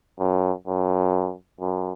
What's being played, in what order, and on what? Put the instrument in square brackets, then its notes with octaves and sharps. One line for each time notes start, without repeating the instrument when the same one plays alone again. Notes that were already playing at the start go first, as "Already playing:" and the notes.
[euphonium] F#2
F#2
F#2